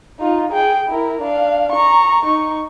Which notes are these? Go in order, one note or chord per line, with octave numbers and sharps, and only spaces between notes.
D#4 F4
G#4 G5
E4 A#4
D4 F5
A#5 C#6
D#4 C#6